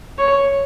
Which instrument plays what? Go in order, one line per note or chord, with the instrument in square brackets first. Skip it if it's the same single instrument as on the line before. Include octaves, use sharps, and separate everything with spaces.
[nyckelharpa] C#5